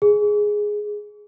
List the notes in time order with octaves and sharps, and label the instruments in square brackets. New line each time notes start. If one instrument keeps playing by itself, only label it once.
[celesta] G#4